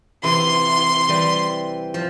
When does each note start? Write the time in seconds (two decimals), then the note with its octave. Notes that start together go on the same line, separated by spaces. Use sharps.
0.23 C3 E3 C6
1.09 E3 G3
1.94 F3